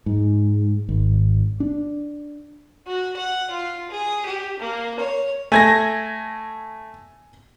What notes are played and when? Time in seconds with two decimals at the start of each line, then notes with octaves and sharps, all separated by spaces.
0.06 G#2
0.89 G#1
1.60 D4
2.87 F#4
3.17 F#5
3.50 F4
3.91 G#4
4.26 G4
4.59 A#3
4.99 C#5
5.52 A3 G#5 G#6 A#6